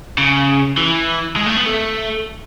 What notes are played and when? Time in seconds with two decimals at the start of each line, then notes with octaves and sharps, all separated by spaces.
0.18 C#3
0.77 E3
1.36 G#3
1.46 A3
1.56 B3
1.66 A3